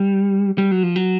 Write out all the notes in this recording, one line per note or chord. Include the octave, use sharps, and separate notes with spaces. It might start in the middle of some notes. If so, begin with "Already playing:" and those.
Already playing: G3
G3
F#3
F3
F#3